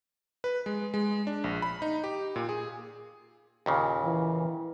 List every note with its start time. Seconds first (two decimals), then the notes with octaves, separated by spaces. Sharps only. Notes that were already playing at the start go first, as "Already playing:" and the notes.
0.44 B4
0.66 G#3
0.94 G#3
1.27 D4
1.44 A#1
1.62 B5
1.82 D#4
2.04 G4
2.36 A#2
2.49 G#4
3.66 D#2 A#2 C#3
4.04 E3